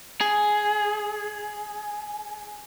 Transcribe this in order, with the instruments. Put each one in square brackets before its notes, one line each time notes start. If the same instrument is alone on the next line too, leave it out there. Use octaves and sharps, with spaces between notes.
[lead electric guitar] G#4